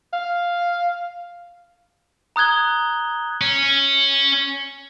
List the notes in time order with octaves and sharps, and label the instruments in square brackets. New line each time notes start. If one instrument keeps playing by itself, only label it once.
[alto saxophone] F5
[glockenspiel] A#5 D#6 F#6 G#6 G7
[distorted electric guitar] C#4